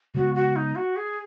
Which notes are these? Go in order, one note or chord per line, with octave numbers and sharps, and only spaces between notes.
C#3 G#3 B3 F#4
F#4
D#4
F#4
G#4